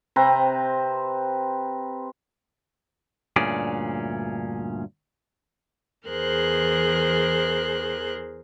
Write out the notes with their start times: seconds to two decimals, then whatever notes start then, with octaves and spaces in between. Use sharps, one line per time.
0.16 C3 C4 B4 A#5
3.36 D2 G2 A#2 C#4 G#4 D5
6.07 E2 E3 G#4 A#4 C5 F#6